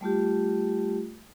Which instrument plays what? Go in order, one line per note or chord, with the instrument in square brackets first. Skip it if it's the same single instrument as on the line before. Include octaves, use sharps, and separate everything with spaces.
[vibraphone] G3 A3 F4 G4